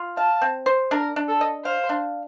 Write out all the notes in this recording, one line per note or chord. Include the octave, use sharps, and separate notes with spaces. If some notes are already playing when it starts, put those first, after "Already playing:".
Already playing: F4
F5 A5
C4
C5
D4 A#4
D4
A4
D#5
C5 F5
D4